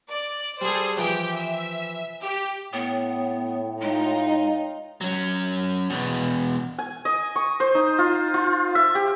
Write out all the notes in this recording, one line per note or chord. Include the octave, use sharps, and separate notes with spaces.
D5
G3 G#4 A4 C5
E3 F3 G4 G5
E5
G4
A2 B3 C#5 G5
G#3 D#4 F4
F#3 C#4
E2 B2
G#5
D#5
C#6
C5
D#4
F4
F4
E5
G4